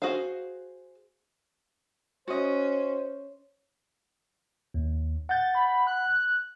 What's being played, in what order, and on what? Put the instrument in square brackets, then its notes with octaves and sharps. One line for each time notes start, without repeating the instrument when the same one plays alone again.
[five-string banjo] F#4 G#4 C5 F5
[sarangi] C#4 [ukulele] F#4 D#5 [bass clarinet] C5
[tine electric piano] D#2
[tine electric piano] F#5 G6 [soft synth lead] A6
[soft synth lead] B5
F#6